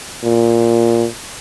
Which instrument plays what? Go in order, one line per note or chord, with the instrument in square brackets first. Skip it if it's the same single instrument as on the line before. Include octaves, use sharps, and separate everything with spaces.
[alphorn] A#2